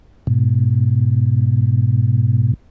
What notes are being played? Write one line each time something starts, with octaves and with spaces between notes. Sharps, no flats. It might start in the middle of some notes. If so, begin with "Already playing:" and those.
G#2 B2